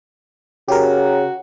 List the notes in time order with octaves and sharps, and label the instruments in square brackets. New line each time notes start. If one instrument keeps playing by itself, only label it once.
[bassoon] C#3 [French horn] F#4 [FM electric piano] G4 A#4